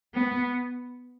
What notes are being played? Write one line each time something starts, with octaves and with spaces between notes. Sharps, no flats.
B3